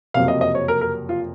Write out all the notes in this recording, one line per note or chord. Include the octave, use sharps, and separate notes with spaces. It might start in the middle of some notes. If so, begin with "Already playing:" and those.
F#1 F2 C3 F#3 A#3 F5
D#5
D#5
C#5
A#4
A#4
F4